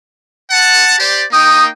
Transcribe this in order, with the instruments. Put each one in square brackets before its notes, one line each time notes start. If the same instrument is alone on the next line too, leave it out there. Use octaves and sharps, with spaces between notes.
[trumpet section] F#5 A5
G4 C5 D5
[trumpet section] A#3 D#4 G5 [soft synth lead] D#6